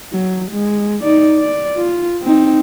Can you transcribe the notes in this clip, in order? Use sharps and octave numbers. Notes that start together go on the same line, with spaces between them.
F#3
G#3
D#4 D5
D5
F4
C4 D#4